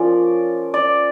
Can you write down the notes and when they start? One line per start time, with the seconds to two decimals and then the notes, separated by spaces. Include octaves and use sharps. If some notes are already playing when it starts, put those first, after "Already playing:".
Already playing: F3 A#3 C#4 D5
0.74 D5